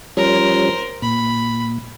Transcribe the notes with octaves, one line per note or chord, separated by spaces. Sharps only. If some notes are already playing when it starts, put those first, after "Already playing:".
F3 G3 C#4 A#4 C5
A#2 B5